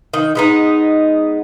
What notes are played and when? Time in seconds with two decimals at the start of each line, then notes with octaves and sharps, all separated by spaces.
0.14 D#3
0.35 G#3 B3 D#4